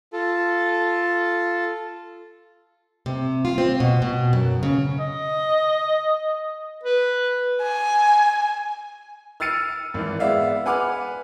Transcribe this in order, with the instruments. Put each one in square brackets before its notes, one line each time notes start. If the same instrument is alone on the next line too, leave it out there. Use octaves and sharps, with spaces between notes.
[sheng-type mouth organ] F4 A4
[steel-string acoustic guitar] C3
F4
C4
B2
B2
F#2
C#3
[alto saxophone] D#5
B4
[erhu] G#5
[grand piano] E6 F6 A6 C#7 D#7
G#1 E3
G#3 B3 D5 E5 F5
B4 F#5 G#5 B5 D6 F6